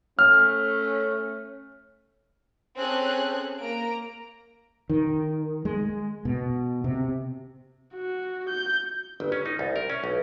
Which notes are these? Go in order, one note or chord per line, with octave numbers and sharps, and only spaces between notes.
A3 C#4 F6
C4 C#4 G#4 A4 F#6
A#3 A#5 D7
D#3
G#3
B2
C3
F#4
G6
G1
C#4
D#4
C2
A#4
C#4
B1